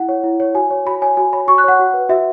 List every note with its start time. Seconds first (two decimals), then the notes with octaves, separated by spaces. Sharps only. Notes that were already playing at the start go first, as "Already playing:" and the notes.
Already playing: E4 F#5
0.09 C#5
0.24 E4
0.40 C#5
0.55 F#4 G#5
0.71 C#5
0.85 F#4 B5
1.02 C#5 G#5
1.17 F#4 G#5
1.33 C#5 B5
1.47 F#4 C#6
1.58 F#6
1.64 C#5 F#5
1.79 F#4
1.94 B4
2.09 F#4 E5